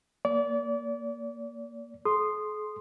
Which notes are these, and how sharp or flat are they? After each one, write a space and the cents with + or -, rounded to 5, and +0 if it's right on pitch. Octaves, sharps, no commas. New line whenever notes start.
A#3 +0 D5 -30
G#4 +45 C6 +0 D#6 -15